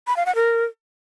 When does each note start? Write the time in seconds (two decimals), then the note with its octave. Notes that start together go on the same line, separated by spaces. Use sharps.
0.07 B5
0.17 F5
0.26 F#5
0.35 A#4